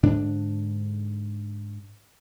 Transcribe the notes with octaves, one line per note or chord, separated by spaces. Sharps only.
G#2 D3 D4